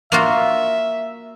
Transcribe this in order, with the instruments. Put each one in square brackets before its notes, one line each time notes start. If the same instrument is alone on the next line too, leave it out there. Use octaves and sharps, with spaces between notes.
[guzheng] A#3 F4 F#4 [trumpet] E5